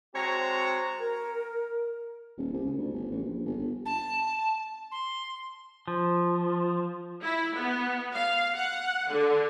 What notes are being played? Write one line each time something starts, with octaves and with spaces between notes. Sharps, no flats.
G#3 C4 F#4 C#5 A5 A#5
A#4
D#1
C2
C#2
D2
G1
A1
A#1
G1
G1
A5
C6
F3
E4
B3
F5
F#5
D3